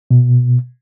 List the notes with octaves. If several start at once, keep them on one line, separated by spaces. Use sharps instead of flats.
B2